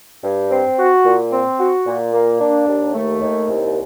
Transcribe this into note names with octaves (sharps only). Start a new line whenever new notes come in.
G2
C4
F#4
A#2
C4
F#4
A#2
A#3
D4
D#2
A3
D#2
C2